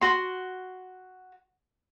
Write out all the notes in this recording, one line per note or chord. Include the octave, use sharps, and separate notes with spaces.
F#4 C6